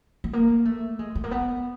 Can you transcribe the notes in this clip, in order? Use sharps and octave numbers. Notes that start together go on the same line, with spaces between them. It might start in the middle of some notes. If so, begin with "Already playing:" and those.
A3
A#3
A3
G#3
A3
A#3
B3